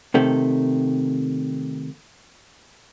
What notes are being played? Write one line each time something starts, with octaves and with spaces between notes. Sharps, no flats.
C3 D#3 A3